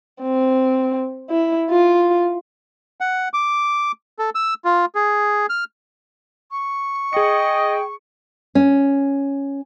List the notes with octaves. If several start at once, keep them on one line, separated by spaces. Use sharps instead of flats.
C4
E4
F4
F#5
D6
A4
E6
F4
G#4
F6
C#6
G#4 D#5 G5 C#7
C#4